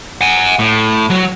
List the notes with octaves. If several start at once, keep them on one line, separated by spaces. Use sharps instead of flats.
F#5 G#5
A2
F#3